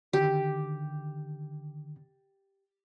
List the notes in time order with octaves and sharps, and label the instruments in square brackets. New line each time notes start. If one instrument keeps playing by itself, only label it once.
[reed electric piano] D3 D#3 [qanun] G4